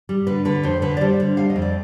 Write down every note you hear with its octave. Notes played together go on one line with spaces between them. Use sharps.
G3
D3 B4
D3 B4
F2 C5
D3 B4
D5
G3 C5
D3
G3 F5
D#5
F2
D5